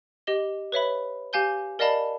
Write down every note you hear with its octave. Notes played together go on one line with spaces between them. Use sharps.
G4 D#5 G7
B4 C#5 E5 B5
G4 F5 G#5 G6 G7
A#4 D5 D#5 F5 A5 B5